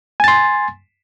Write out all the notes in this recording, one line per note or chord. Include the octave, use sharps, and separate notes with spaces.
G#5 C6 A6